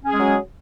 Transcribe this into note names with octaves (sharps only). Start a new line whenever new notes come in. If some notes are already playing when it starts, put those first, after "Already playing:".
F#3 G#3 C#4 G#4